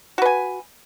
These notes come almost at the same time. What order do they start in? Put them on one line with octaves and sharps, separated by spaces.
F#4 B4 G#5